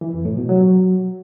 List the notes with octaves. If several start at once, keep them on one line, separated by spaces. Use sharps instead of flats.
E3
F2
A2
B2
F#3